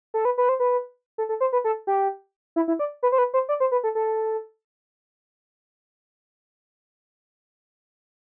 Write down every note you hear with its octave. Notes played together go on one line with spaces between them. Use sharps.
A4
B4
B4
C5
B4
A4
A4
C5
B4
A4
G4
E4
E4
D5
B4
C5
B4
C5
D5
C5
B4
A4
A4